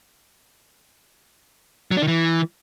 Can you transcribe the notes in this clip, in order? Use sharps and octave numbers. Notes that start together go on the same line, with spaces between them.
F#3
D4
D#3
E3